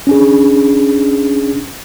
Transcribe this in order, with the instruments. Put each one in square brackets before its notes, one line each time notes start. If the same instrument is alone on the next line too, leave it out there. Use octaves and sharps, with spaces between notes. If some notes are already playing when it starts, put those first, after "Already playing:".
[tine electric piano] C#4 D4 G#4